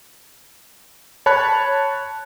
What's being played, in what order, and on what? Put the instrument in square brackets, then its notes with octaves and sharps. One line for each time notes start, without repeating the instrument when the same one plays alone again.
[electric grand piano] C#5 A5 B5 F#6